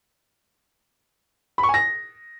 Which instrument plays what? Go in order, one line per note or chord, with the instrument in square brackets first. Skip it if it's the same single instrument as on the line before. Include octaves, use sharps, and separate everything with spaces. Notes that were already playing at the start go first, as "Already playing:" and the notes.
[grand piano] B5
C#6
G#5
A#6